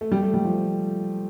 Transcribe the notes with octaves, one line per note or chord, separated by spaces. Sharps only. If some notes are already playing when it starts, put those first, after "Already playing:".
A3
G3
A3
G3
F3